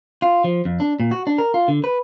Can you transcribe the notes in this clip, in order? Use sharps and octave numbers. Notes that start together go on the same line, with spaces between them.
F4
F3
F2
D4
A#2
F#4
D4
A#4
F4
D3
B4